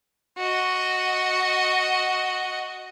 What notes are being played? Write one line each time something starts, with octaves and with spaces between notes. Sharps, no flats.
F#4 D#5